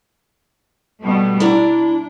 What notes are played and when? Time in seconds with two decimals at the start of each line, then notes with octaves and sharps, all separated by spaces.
1.01 B2 G3 A3
1.40 D4 E4 D5 A#5